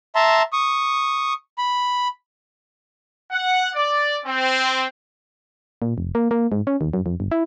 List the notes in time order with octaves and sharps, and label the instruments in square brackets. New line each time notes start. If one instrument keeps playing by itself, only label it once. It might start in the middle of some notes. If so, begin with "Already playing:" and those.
[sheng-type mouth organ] E5 A5 A#5 C6
C#6 D#6
B5
[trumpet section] F#5
D5
C4
[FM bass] A#2
F1
A#3
A#3
G#2
C#4
D#2
F#2
F2
G1
E4